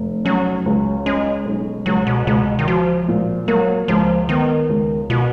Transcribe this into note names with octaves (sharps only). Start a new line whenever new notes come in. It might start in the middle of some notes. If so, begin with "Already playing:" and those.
Already playing: F1
F#3 C#4
C#2
G#3 C#4
B1
C#2 F#3
B2
C#2 B2
D#3
F3 F#4
A#2
F#3 A#3
C#2 F3
D#3 B3
C#2
B2 F4